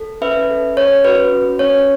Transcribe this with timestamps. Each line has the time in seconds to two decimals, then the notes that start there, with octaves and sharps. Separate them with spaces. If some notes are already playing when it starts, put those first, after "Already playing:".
Already playing: A4
0.21 C#4 B4 E5
0.50 A4
0.77 C#4 C#5
1.05 F#4 B4
1.32 C#4
1.59 C#4 C#5